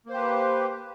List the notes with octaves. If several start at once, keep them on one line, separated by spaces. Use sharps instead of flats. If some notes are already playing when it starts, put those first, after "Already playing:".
A#3 G4 B4 C5